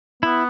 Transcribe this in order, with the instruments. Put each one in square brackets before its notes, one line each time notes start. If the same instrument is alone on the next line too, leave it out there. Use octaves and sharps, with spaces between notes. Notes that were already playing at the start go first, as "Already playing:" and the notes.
[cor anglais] B3 [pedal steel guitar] E4